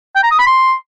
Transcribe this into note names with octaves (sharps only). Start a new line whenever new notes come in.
G5
A#5
D#6
B5
C6